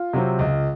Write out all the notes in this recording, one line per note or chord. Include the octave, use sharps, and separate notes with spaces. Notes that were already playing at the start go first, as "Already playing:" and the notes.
Already playing: F4
C3 F#3 C4
C#2